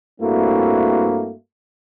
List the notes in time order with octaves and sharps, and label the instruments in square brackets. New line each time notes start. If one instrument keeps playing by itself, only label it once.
[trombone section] G2 A3 A#3 C4 E4 F#4